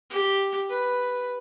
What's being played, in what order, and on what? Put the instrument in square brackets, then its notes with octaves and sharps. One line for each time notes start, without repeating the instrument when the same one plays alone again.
[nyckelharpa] G4
B4